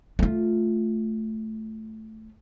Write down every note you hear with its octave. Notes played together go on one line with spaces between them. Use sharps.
A3 F4